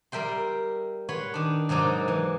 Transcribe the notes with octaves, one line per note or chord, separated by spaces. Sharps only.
G3 A#4 E5 G5 C6
B4 C#5 F#5 C6
D#3 D4
G#2 C3 F#3 D#4 D5
E3